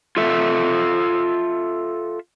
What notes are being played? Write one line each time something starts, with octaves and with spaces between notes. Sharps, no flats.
F4 A4 E5